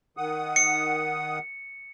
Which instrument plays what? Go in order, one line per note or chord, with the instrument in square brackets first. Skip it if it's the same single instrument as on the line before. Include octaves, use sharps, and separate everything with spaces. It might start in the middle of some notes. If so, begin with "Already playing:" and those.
[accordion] D#3 F#5 D#6
[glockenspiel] C#7